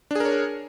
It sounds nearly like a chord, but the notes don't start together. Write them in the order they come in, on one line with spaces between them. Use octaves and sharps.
D4 G#4 A#4 C#5